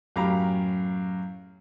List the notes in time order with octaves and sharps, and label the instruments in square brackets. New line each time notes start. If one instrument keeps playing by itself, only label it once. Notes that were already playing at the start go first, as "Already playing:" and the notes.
[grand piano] F#2 A2 G4 F5 A#5 B5